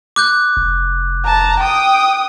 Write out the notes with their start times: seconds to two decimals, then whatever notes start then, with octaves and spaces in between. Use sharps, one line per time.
0.16 D6 F#6 G6
0.57 F1
1.25 A5 A#5
1.60 G5 D#6